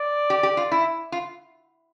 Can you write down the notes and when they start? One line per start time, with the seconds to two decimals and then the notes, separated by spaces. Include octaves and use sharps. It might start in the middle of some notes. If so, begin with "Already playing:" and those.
Already playing: D5
0.30 G4
0.43 G4
0.57 F4
0.72 E4
1.12 F4